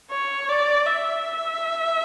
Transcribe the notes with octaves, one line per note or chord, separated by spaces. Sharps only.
C#5
D5
E5